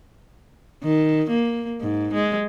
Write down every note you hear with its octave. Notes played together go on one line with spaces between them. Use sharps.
D#3
A#3
G#2
G#3